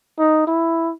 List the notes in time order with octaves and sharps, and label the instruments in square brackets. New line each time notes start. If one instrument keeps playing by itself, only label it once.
[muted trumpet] D#4
E4